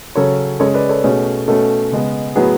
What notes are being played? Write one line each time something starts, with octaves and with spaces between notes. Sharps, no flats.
C#3 F#3 C#4 A4 C#5
C#3 G#3 C#4 A4 C#5
B4 D5
A4 C#5
B2 A3 C#4 G#4
B2 A3 C#4 A4
C#3 G#3 B3
A2 F#3 B3 G#4 B4